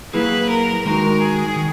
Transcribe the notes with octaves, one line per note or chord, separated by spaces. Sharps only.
F#3 A#3 E4 G#4 B4
A#4
D#3 G#3 D#4 F#4 A#4
G#4
D#3